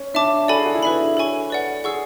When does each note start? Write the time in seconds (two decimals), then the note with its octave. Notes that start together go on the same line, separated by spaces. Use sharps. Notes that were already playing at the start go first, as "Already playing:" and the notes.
Already playing: C#4
0.14 D4 E5 A5 D6
0.48 F#4 A4 D5 G#5 B5
0.57 G#4
0.66 F#4
0.74 E4
0.83 D4 B4 E5 B5
1.17 A4 C#5 G#5 C#6
1.50 B4 D5 F#5
1.84 G#4 F#5 C#6 E6